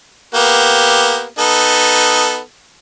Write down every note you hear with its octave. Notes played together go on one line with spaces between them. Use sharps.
A#3 B3 G4
B3 D#4 A4